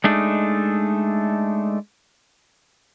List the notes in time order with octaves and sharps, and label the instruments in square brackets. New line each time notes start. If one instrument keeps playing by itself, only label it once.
[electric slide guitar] G#3 A3 D4 D#4